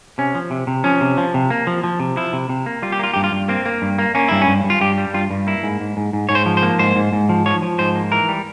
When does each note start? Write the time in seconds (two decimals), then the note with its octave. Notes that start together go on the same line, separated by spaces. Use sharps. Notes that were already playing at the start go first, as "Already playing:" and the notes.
0.18 C3 C#4
0.35 F3
0.51 C3
0.67 C3
0.84 F3 C#4
1.01 C3
1.18 F3
1.34 C3
1.50 A#3
1.67 F3
1.84 F3
2.00 C3
2.17 F3 E4
2.33 C3
2.49 C3
2.66 A#3
2.82 G3 F4
2.92 G4
2.99 A#3 F4
3.14 G2 G4
3.24 F4
3.32 G2
3.48 A#3 C4
3.66 A#3
3.82 G2
3.99 A#3
4.15 A#3 C#4
4.28 G2 E4
4.42 C#4
4.48 G2
4.64 G2
4.70 F4
4.81 G2 G4
4.98 G3
5.14 G2 F4
5.31 G2
5.47 A#3 E4
5.63 G#2
5.81 G#2
5.97 G#2
6.13 G#2
6.29 G#2 C#5
6.35 C5
6.46 F3
6.57 C5
6.62 A#3
6.79 G#2 C5
6.96 G#2
7.13 G#2
7.29 F3
7.46 F3 C#5
7.62 F3
7.79 G#2 C5
7.95 A#3
8.11 E3 A#4
8.29 G3